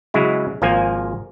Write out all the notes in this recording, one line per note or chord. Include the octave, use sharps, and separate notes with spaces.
C#3 F#3 G#3 E4
G#1 F3 A#3 G#5